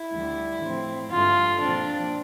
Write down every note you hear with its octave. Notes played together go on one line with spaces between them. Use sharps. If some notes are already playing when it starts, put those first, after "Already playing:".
Already playing: E4
D2 D3 G3
A2 F3 C4
G2 D3 A3 F4
A#2 F3 C4 D4